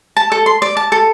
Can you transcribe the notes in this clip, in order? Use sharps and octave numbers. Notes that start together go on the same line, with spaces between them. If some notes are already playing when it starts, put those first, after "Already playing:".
A5
A4
C6
D5
A5
A4